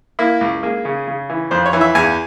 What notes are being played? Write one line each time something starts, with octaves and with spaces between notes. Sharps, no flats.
A#3 E4
C#2
A#3 G#4
C#3
C#3
E3
F2 C5
C#5
E3
E5
E2 G#5